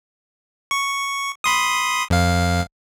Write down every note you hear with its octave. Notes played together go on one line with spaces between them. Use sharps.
C#6
B5 C6 D#6
F2 F5